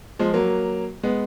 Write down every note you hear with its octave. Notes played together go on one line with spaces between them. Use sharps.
F3 G#3
F#3 A#3
G#3 B3